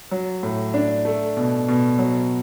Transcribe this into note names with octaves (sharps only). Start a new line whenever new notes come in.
F#3
A2
D4
A3
B2
B2
F#3